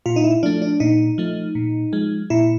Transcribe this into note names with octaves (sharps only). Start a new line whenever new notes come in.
A#2 F4
D#4
E4
F3 A3 D4
D4
A#2 D#4
F3 A3
A#2
F3 G#3
A#2 E4